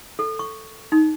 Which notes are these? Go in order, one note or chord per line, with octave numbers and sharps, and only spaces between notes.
A4
C#6
D#4